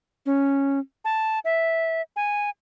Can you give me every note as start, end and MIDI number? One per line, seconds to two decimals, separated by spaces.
0.26 0.79 61
1.05 1.39 81
1.45 2.02 76
2.16 2.50 80